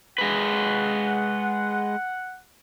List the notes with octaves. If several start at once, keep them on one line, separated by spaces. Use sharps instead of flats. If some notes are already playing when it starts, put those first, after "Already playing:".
G#3 B4 F#5